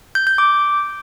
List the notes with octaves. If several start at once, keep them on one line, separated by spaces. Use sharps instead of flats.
G6
G6
D6